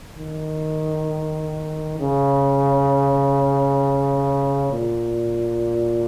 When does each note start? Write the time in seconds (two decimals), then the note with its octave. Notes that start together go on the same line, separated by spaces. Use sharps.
0.18 D#3
2.00 C#3
4.72 A#2